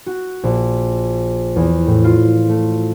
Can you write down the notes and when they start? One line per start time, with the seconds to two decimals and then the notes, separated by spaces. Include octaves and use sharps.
0.06 F#4
0.43 A#1
1.56 E2
1.87 A2
2.04 F4
2.49 A3